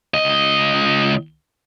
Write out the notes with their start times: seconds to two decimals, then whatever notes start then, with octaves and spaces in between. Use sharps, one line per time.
0.14 C#2 D#5